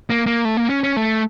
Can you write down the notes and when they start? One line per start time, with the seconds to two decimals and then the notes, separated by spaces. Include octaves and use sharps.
0.10 A#3
0.26 A#3
0.45 A3
0.57 A#3
0.70 C#4
0.83 C#4
0.97 A3